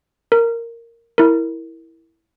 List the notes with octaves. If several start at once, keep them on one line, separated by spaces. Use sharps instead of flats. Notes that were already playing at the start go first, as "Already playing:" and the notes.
A#4
E4 A#4